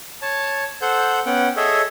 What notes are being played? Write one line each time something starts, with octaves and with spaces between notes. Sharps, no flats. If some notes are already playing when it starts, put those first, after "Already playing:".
C#5 A5
A4 C5 F#5 G6
B3 C#4 F#5 G5
G#4 A4 C#5 D#5 E5